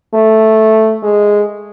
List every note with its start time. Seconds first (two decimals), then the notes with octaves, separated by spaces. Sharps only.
0.14 A3
1.03 G#3